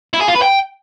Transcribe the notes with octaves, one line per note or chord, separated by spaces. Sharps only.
E4
G#4
F4
B4
G5